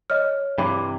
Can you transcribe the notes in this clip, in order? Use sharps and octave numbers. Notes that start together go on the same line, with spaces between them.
C#5 D#5 F6
G2 C3 E3 B5 D6